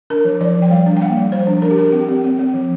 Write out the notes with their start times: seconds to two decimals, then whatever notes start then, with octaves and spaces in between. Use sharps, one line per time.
0.10 D4 A#4
0.25 F3
0.41 F3 D5
0.55 F3
0.62 G5
0.70 G3 F5
0.86 D4
0.97 G5
1.02 A#3 F5
1.17 G3
1.32 F3 C5
1.47 D4
1.62 D4 A#4
1.71 G4
1.78 D4 A#4
1.92 C4 G4
2.08 C4
2.24 C4
2.39 C4
2.54 F3